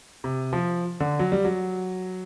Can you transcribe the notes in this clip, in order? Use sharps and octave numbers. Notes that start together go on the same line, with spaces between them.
C3
F3
D3
F#3
G3
F#3